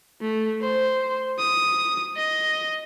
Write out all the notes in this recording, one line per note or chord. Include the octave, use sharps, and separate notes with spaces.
A3
C5
D#6
D#5